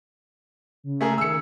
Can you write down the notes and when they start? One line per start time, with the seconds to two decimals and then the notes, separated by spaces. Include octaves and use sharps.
0.84 C#3
1.01 A3 G#4 A#4
1.18 D#3 E6 C#7